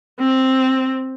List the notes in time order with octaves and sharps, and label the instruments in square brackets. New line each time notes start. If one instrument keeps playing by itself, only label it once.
[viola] C4